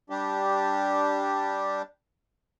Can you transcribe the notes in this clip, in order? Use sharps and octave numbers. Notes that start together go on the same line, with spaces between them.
G3 D4 G4